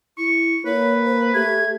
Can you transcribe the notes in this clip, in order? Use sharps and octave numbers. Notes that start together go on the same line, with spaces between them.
E4 C#6
A#3 B4 C#5
C5
A3 G4 G#6